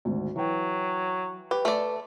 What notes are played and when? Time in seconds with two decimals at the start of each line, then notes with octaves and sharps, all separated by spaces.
0.05 G#1 D2
0.36 E3 F#3 G5
1.51 G4 B4
1.65 A3 D5